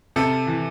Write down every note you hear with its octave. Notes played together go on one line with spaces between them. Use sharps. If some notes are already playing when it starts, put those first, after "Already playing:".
C3 A4
E3